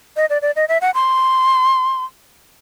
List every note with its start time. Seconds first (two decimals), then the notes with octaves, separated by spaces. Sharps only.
0.16 D#5
0.30 D5
0.42 D5
0.56 D#5
0.69 E5
0.81 F#5
0.95 C6